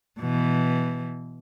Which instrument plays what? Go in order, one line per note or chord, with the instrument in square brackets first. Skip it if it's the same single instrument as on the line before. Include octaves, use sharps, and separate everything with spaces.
[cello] B2 E3